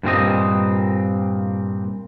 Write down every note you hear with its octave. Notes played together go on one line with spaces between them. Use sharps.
G2 A#2 C4 D#5